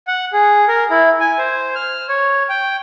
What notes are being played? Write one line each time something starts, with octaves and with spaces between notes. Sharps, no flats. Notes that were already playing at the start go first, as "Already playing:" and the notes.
F#5
G#4
A#4
E4
G#5
C5
F6
C#5
G5